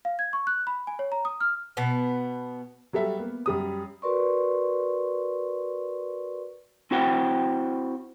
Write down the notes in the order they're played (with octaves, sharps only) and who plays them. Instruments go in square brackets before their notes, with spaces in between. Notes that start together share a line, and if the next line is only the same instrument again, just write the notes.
[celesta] F5
G#6
C#6
F#6
B5
G#5
C#5
A#5
D#6
F6
[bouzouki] B2 B3
[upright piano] F#3 G3 A4 E5
A#3 B3
F#2 G3 D#6
[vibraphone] F#4 A#4 B4 D5 C6 C#6
[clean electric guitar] C4 E4 F#4 C5 F#5 G5